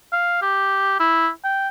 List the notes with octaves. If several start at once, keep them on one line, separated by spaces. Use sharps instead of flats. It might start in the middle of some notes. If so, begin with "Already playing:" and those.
F5
G4
E4
G5